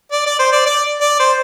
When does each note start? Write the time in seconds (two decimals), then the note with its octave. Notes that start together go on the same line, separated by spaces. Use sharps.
0.12 D5
0.26 D5
0.39 C5
0.52 D5
0.66 D5
1.01 D5
1.20 C5